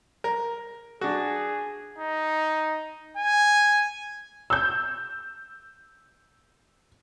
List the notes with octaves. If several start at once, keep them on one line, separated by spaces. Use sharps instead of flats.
A#4
D4 F#4 G#4
D#4
G#5
E6 G6